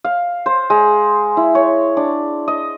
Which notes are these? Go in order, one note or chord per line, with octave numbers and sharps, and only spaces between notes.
F5
C5
G#3
E4
C#5
D4
D#5